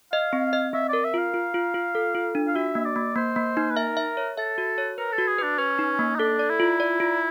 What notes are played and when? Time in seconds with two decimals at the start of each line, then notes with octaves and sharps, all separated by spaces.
0.12 D#5 F5
0.33 C4
0.53 D#5
0.73 C4 E5
0.89 A#4 D5
1.04 E5
1.14 F4 F5
1.34 F4
1.54 F4
1.74 F4
1.95 A4
2.15 F4
2.35 D4
2.47 F5
2.55 F#4 E5
2.75 A#3
2.85 D5
2.96 A#3
3.16 A#3 C5
3.36 A#3
3.57 D#4
3.71 B4
3.76 A#4 E5
3.97 E5
4.17 C#5
4.37 A4 E5
4.58 F#4
4.78 C#5
4.98 A#4 B4
5.13 A4
5.18 F#4
5.28 G#4
5.38 D4 B4
5.58 C#4 B4
5.79 D#4
5.99 A#3
6.15 D#4
6.19 D4 A4
6.39 D5
6.50 E4
6.60 F4
6.80 D5
7.00 F4